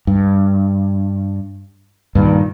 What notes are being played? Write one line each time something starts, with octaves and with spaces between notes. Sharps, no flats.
G2
G2 A#2 D#3